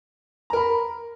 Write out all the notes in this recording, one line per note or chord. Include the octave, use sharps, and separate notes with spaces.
A#4 A#5 B5